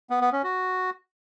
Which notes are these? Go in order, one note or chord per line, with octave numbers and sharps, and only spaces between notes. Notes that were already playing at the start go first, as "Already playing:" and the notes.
B3
B3
C#4
F#4